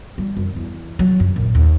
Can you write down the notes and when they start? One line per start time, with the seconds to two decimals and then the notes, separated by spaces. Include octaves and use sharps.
0.18 G3
0.37 F#2
0.56 E2
0.99 F#3
1.20 F#2
1.36 A#1
1.55 D#2